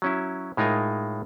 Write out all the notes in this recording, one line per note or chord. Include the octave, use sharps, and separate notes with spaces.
F#3 C#4 E4
A2 G#3 D#4 F4 A#4 G#5